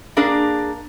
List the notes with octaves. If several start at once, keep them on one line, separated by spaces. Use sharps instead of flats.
A#3 D4 G#4 A#4